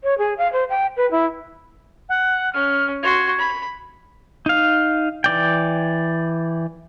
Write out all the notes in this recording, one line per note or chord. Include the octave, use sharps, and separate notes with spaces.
C#5
G#4
F5
C5
G5
B4
E4
F#5
C#4 F6
F#4 C6 G#6
B5
D#4 F5
E3 D5 G5